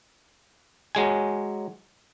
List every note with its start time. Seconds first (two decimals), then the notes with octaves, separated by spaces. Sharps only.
0.95 F#3 G#3 G#5